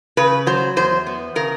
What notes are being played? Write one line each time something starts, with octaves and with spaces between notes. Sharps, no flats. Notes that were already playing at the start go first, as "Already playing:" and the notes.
C#3 B4
F#3 C5
E2 C5
B3
C#3 A#4